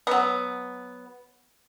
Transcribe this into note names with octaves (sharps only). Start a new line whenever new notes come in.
F#3 B3